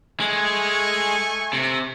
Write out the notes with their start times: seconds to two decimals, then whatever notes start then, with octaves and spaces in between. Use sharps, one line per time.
0.20 G#3 A3 G#5 C#6
1.53 C3